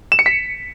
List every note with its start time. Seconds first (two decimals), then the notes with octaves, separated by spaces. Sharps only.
0.12 E7
0.19 C#7
0.26 B6